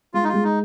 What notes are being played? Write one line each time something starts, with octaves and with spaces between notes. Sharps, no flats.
G#3 F4
D#4
F4
G#3
D#4